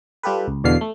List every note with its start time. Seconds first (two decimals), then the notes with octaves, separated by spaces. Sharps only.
0.23 G3 F4 G4 A4 B4
0.48 C#2
0.64 E2 B2 D3 F5 C7
0.81 A3